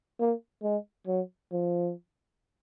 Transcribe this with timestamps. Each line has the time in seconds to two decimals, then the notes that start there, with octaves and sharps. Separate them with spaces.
0.20 A#3
0.63 G#3
1.07 F#3
1.53 F3